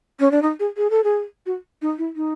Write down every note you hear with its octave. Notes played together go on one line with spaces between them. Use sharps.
C#4
D4
D#4
G#4
G#4
A4
G#4
F#4
D#4
E4
D#4